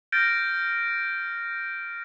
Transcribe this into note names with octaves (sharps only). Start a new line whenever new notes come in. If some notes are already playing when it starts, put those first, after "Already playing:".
F6 G6 A6 A#6 D7